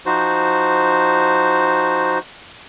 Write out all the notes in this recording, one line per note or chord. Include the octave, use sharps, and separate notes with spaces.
F3 D#4 F#4 C5